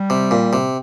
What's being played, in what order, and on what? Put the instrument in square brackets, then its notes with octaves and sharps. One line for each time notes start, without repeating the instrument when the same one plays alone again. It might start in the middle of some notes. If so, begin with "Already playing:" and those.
Already playing: [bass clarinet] G3
[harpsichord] C3
A#2
C3